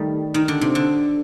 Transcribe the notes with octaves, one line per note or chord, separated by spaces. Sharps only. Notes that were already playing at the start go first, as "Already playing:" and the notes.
Already playing: D#3 G3 A3
D#3
D3
C3
D3